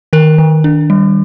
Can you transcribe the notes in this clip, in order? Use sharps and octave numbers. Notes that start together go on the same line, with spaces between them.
D#3 A#4
D#3
D4
G3